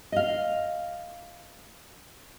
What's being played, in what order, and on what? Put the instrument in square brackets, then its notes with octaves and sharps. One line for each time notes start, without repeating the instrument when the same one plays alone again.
[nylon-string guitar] D#5 F5